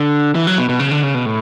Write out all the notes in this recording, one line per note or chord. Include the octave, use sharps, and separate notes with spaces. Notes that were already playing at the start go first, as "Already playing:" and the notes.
Already playing: D3
E3
F#3
B2
B2
C#3
D3
C#3
B2
A2